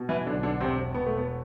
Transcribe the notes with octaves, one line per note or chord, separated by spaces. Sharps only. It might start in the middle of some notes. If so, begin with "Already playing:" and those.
Already playing: B2
E3 E4
B1 D3 D4
D3 D4
E1 C3 C4
E1 B3
A3
B3